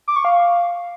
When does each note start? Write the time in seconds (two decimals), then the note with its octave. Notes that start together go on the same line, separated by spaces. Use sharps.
0.08 D6
0.16 C#6
0.25 F5